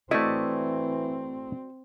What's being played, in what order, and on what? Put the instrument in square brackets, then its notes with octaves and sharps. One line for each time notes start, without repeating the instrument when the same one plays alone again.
[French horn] E3 [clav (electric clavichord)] A3 E4 [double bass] C4 [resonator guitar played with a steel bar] F#4 D5 D#5